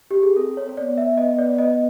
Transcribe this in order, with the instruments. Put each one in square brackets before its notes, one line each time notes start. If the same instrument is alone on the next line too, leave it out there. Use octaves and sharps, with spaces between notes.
[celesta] G4
G#4
[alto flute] C4 [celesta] A4
[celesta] C#5
C#5
[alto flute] B3 [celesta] D5
[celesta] E5
D#5
D5
D#5